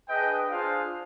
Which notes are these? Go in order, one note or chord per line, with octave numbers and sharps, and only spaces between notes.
D4 G#4 B4 D#5 G5
D4 F4 G#4 C5 F5